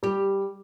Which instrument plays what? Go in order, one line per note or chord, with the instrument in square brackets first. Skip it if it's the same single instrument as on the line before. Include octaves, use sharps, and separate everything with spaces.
[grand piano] G3 [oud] G4